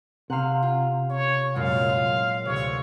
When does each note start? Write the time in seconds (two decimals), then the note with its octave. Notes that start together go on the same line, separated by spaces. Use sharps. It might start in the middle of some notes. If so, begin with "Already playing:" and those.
0.30 C3 F5 F#5
0.62 F4
1.10 C#5
1.55 F#2 A#2 G#3 F5
1.89 F4
2.45 D2 C3 C#5